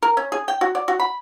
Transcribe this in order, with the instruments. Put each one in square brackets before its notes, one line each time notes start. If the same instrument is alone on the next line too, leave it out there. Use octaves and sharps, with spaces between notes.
[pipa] A#4
C#4
G#4
G5
F#4
D5
F#4
B5